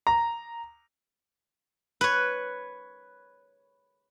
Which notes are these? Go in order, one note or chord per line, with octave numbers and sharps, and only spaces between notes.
A#5
B4 C#5